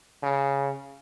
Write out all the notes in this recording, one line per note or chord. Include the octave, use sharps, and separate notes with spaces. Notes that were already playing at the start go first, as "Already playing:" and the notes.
C#3